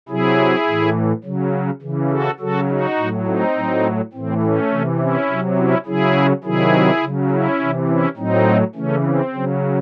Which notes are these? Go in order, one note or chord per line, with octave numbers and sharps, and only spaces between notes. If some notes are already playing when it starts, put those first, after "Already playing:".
C3 F#3 E4 G#4
A2 E3
C#3 F#3
C#3 E3
F#4 A4
C#3 F#3 F#4 A4
D#4 F#4
A2 F#3
C4 D#4
A2 F#3
A2 E3 C4
A3 C#4
C3 E3
C#4 E4
C3 F#3
C#4 E4
C#3 F#3 E4 G#4
C3 D#3 F#3 E4 G#4
C#3 F#3
C#4 E4
C3 E3
C#4 E4
A2 F#3 C4 D#4
C#3 E3 A3 C#4
C4
C#3 F#3